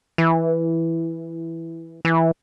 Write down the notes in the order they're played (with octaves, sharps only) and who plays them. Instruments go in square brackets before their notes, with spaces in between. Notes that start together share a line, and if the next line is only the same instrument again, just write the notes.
[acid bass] E3
E3